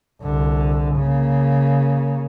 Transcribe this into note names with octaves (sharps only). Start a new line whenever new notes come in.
C2 D3
C#3 A#3